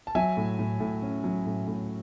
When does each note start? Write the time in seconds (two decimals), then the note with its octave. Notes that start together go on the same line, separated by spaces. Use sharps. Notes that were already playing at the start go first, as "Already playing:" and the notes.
0.07 A5
0.15 F#3 E5 G#5
0.37 A2
0.59 A2
0.80 A2
1.02 C#4
1.24 F#3
1.46 A2
1.68 A2